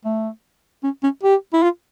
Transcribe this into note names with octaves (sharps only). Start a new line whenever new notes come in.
A3
C#4
C#4
G4
E4
F4